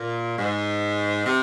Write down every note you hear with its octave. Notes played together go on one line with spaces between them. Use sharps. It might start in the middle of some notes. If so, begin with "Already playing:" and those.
Already playing: A#2
G#2
C3